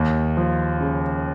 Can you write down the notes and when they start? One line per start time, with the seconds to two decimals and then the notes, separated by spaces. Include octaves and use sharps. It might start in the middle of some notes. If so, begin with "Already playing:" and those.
Already playing: D#2
0.37 F3
0.81 C#3